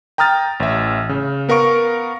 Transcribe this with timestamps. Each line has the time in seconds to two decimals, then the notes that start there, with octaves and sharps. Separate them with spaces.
0.18 G5 A#5 D#6 F6 A6
0.60 A1 E5
1.09 C#3
1.49 B3 A#4 F5 C#6 D7